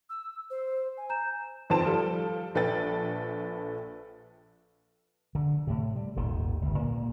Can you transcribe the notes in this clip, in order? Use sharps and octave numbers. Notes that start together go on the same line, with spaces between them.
E6
C5
G#5
A#5 G6 E7
G#1 F2 B4 C5 A5 D7
F3 G3 A4
A#1 A4 B4 G5 A6
D3
A2 C3
G3
D#1 G#1 D#2 D#3
G1 C#2
A#2 A#3